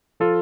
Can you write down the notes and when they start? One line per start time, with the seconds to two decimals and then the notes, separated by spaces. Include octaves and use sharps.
0.20 F3 F4 A4